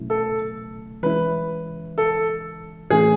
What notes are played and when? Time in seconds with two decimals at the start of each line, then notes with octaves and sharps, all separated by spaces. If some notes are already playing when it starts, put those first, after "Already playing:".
Already playing: B2 F#3 A3 C#4 E4
0.10 A4
1.03 E3 G#3 C#4 E4 B4
1.98 A4
2.90 A2 E3 A3 C#4 G#4